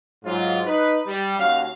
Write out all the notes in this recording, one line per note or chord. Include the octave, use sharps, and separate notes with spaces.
G#2 F#3 F4
D#4 B4
G3
D#2 C#4 F#4 F5